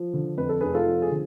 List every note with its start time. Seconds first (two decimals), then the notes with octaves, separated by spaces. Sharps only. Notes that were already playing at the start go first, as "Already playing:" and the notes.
Already playing: F3
0.13 D3
0.37 F2 B4
0.49 A4
0.61 F1 G#4 B4
0.74 F4 A4
0.87 F3
1.02 G#4
1.11 D3